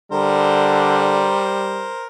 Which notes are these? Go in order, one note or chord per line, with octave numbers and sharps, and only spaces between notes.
D3 G3 A#4 C5